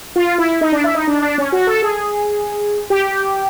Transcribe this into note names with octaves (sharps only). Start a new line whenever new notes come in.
F4
E4
D#4
D4
E4
D#4
D4
D4
C#4
F#4
A4
G#4
G4